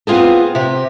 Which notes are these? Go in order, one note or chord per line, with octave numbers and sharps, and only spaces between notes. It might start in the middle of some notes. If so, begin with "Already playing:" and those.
B3 C4 F4 G#4 A4
C3 G4